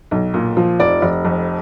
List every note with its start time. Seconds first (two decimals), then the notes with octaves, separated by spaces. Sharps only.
0.11 B1
0.34 A#2
0.57 F3
0.79 F1 D5
1.02 F1
1.25 F2